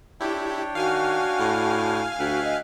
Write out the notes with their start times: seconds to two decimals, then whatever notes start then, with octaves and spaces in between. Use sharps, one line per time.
0.20 D4 E4 G4 C#5 G5
0.75 D#3 F#4 F5 G#5 F6
1.40 A2
2.19 D2 F#4 E5 G5 F#6
2.44 D#5